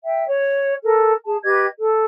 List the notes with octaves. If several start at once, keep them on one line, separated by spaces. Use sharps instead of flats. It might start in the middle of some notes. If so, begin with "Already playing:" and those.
E5 G5
C#5
A4 A#4
G#4 A5
G4 B4 D#5 G#6
A4